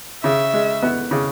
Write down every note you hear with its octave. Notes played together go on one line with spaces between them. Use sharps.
C#3 E5
G#3
B3
C#3